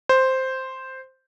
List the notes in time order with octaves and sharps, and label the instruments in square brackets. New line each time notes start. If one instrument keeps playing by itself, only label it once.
[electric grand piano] C5